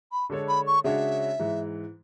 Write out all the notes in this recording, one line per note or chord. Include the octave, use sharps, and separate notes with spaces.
B5
D3 G#3 D4 A4 C#5
B5
C#6
C#3 G#3 D4 F#4 C#5 E5
G#2 E3 G#3